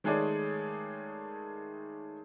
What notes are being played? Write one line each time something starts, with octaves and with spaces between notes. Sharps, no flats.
D#3 G#3 A3 G#4 C#5 D5